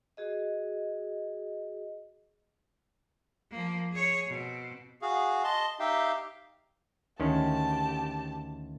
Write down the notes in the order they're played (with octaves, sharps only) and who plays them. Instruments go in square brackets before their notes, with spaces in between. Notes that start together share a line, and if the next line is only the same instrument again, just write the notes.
[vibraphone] F#4 G#4 D#5
[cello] F3 A#3
G#4 C#5
B2 C4
[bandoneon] F#4 G#4 F5
D#5 A5 C6
D#4 G4 E5 F5 G5
[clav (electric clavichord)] D2 D#3 C#4 [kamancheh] G4 A5